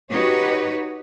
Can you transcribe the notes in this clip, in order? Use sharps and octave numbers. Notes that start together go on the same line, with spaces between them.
D#4 F#4 G4 B4 C#5